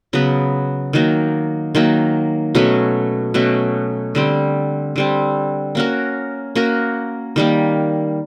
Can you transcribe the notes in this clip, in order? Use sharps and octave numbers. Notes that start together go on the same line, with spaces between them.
C#3 F#3 B3
D#3 F#3 A#3
D#3 F#3 A#3
B2 F#3 A3 C#4
B2 F#3 A3 C#4
D3 G3 C4
D3 G3 C4
A#3 C#4 F#4 A#4
A#3 C#4 F#4 A#4
D#3 G3 A#3